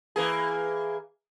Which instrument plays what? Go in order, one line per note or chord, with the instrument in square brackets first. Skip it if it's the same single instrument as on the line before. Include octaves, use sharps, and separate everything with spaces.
[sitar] E3 A#3 G#4